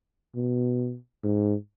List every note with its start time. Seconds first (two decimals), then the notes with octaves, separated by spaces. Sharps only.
0.36 B2
1.24 G#2